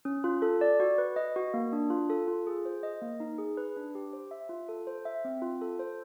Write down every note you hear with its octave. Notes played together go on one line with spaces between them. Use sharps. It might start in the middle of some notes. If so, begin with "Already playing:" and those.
C#4
F4
A4
D5
F#4
B4
D#5
F#4
A#3
D4
F4
A4
F4
G#4
C5
D#5
A#3
D#4
G#4
B4
D4
G4
C5
E5
F4
A4
C5
E5
C4
F4
A4
C5